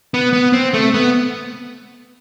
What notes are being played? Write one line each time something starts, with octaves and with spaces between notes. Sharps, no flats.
B3
B3
C4
A3
B3